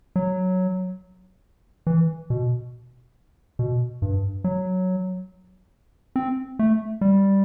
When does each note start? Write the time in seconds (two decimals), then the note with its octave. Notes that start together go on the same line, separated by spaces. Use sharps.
0.16 F#3
1.87 E3
2.30 B2
3.59 B2
4.02 G2
4.44 F#3
6.16 C4
6.59 A3
7.01 G3